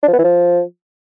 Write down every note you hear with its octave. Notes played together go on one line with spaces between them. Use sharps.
D4
F3
B3
E3
F3